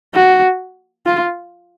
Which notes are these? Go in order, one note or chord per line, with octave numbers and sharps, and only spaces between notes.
F#4
F4